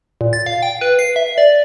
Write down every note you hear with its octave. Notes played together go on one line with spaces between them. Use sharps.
A#2
A6
F5
G5
B4
C7
E5
D5